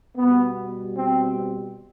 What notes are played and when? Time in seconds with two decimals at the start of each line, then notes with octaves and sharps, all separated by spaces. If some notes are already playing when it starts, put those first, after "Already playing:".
0.17 B2 G3 B3
0.97 C4